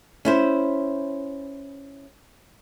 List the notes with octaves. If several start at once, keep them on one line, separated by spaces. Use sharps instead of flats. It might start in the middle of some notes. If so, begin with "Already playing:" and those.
C#4 E4 C5